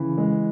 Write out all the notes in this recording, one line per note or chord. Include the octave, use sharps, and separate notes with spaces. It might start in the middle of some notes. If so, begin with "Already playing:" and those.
Already playing: C#3 E3
G#3